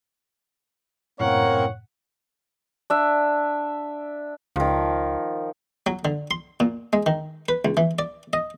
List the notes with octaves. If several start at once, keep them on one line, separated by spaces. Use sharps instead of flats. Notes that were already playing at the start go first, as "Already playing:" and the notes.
F#2 A2 C3 A#3 C4 A#4 C#5 F#5
D4 E5
C#2 D#3 F3
F#3
D3
C6
A#2
G#3
D#3
B4
C#2
E3
D5
D#5